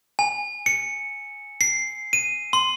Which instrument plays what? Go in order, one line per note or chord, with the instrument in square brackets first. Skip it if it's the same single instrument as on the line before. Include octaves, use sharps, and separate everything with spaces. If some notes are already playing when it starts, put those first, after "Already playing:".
[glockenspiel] G#5
C#7
C7
D#7
C6